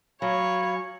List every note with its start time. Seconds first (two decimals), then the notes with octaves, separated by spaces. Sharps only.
0.22 F#3 C#5 F5 G#5 B5